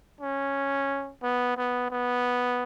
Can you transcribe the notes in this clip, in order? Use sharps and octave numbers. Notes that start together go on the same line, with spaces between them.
C#4
B3
B3
B3